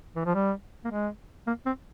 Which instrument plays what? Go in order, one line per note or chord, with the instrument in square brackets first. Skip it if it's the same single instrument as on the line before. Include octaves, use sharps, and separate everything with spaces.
[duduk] E3
F3
G3
A#3
G#3
A#3
C4